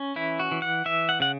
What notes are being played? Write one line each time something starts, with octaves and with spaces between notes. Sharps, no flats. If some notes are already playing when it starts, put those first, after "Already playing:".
Already playing: C#4
E3 E4
F#4
E3
F#5
E3 E5
F#5
C#3 F#5